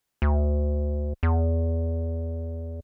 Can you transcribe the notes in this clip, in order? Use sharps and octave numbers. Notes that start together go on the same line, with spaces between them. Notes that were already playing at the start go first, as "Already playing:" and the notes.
D2
E2